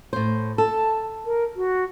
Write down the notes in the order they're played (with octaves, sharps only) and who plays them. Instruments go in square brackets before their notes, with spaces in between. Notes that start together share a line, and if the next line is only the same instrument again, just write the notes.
[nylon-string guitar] A2 C5
[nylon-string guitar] A4 [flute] A5
[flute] A#4
F#4